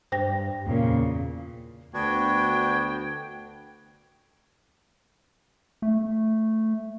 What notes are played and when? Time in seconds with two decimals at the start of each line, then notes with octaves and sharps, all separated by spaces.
0.12 G2 C5 G5 A#6
0.66 E2 A#2 C#3
1.94 D2 B3 D4 F#4 G5 G#6
5.82 A3